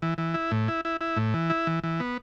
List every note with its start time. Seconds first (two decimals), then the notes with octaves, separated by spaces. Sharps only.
0.02 E3
0.18 E3
0.34 E4
0.51 A2
0.68 E4
0.85 E4
1.01 E4
1.17 A2
1.34 E3
1.50 E4
1.67 E3
1.83 E3
2.00 B3